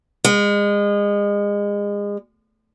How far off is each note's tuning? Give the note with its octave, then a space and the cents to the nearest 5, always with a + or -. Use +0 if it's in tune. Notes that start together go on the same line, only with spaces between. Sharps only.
G#3 -30